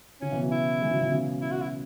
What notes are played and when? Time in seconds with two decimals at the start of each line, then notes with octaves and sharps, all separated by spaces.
0.21 C#3 C#4
0.32 B2 E3
0.41 C#3 F#3
0.52 E4
0.81 E3 G#3
0.91 C#3 F#3
1.01 B2 E3
1.11 C#3 F#3
1.42 E4
1.51 F#4
1.61 E4